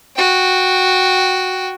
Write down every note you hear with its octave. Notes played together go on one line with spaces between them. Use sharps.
F#4 G5